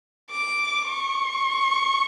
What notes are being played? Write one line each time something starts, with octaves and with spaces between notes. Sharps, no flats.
D6
C#6